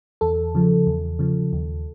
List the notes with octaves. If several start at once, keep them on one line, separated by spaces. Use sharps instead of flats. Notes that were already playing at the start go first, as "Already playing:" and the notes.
E2 A4
C#3 F3
E2
C#3 F3
D#2